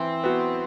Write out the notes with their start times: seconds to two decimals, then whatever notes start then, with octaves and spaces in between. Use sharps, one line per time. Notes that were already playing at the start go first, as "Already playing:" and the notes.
Already playing: E3 C4
0.24 B3 F#4